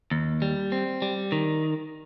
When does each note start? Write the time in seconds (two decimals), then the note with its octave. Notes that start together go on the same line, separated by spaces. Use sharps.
0.11 D#2
0.42 G3
0.72 C4
1.02 G3
1.32 D#3